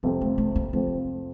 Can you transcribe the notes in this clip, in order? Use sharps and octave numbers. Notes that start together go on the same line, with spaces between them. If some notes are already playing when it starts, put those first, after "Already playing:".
F2 C3 F3 G3 C4
A3
A3
A#3
F2 C3 F3 A3 C4